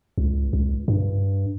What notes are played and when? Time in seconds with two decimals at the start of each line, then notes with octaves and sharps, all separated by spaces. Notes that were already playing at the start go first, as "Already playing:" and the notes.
0.18 C#2
0.53 C#2
0.88 G2